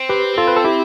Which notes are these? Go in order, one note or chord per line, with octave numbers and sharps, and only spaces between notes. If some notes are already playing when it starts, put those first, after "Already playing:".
Already playing: C4
G4 B4
F4 A4
B4
A4
E4 G4